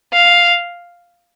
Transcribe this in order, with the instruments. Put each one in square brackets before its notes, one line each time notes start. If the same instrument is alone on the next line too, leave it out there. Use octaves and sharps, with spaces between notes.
[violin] F5